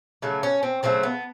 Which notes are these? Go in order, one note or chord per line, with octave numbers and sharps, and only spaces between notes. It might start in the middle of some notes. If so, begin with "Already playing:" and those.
C#3 F#3 A3
C#4
C4
C#3 F#3 A3 C4
B3